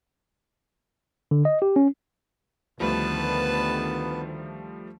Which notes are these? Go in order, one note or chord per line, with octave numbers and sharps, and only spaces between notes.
D3
D#5
G4
C#4
D2 D#3 F3 G3 A3 B3 B4 A5